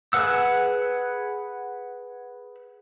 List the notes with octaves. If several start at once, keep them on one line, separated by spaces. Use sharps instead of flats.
G#4 B4 F#5 E6